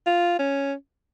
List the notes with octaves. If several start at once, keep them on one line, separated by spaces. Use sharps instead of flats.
F4
C#4